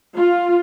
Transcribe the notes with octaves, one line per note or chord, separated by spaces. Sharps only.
F4